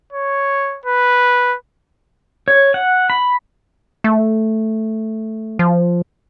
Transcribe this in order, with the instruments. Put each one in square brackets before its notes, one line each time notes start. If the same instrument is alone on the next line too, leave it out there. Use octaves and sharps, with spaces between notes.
[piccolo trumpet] C#5
B4
[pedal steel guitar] C#5
F#5
B5
[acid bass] A3
F3